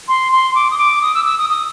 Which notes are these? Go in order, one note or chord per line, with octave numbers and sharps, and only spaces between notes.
C6
C6
D6
D#6
D6
D#6
E6
E6
D#6
D#6